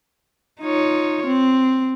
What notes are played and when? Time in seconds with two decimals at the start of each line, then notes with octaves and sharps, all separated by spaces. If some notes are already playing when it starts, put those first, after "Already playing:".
0.61 D#4 F4 C#5
1.27 C4